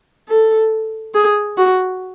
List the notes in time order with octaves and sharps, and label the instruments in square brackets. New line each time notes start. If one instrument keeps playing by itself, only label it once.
[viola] A4
G#4
F#4